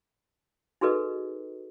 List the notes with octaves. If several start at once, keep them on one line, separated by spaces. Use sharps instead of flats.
D#4 F#4 G#4 A4 B4 D#5